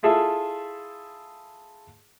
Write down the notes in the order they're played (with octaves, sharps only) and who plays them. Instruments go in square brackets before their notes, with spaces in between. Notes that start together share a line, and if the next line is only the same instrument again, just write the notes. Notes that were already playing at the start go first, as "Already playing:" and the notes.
[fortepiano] E4 F4 G#4 A4 E5